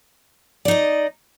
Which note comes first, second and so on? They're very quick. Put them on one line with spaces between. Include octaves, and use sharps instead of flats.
D5 D#4 D#5